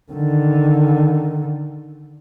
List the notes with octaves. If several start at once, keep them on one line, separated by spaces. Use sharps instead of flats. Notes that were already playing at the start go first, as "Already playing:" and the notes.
D3 D#3